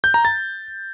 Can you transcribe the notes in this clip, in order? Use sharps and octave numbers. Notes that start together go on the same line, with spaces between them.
G6
A#5
A6